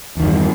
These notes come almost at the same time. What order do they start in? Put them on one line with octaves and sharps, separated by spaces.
E2 D#3 G2